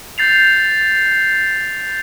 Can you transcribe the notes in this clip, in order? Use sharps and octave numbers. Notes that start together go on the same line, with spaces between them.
G6 A6 C7 F7